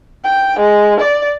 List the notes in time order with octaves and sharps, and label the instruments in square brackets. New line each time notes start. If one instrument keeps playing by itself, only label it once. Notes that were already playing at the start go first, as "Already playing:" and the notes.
[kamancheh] G5
G#3
D5